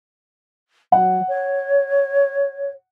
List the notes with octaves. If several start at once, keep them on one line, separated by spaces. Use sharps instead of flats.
F#3 F#5
C#5